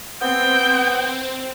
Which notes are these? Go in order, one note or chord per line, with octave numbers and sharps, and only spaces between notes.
B3 C4 G5